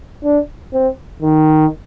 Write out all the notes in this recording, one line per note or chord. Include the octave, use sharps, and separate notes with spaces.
D4
C4
D#3